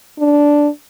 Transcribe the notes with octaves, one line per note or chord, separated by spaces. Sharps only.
D4